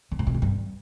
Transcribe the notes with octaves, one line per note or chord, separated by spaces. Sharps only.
D3
C#3
B2
D3
G2